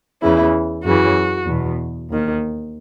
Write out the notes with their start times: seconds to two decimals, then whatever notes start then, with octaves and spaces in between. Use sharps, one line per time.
0.22 E2 C#3 E3 E4
0.84 F#2 C#3 E3 F#4
1.47 E2 B2
2.09 D#2 D#3